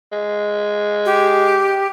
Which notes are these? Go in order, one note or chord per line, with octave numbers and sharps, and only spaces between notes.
G#3
G4